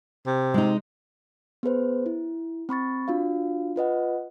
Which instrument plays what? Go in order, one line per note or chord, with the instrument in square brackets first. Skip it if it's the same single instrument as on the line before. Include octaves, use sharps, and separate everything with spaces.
[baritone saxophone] C3
[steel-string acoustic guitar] G#3 D#4
[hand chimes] B3 G#4 B4 C5
E4
C4 B5 C#6 A6
D4 F4 F#4 F5
F4 B4 D#5 F#5